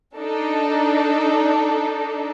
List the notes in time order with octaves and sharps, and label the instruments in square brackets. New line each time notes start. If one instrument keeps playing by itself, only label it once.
[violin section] D4 D#4 A4